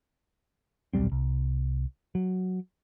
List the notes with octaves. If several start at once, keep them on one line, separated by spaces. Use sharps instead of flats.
D#1 B1 G3 C4
C2
F#3